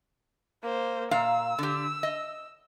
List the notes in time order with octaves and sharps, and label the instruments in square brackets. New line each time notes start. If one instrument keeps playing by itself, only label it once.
[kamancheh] A#3 C5
[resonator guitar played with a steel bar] A#2 F5 A#5 [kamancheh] E6
[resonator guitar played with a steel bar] D3 G4
D#5